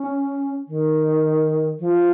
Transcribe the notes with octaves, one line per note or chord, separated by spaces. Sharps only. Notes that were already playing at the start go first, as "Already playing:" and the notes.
Already playing: C#4
D#3
F3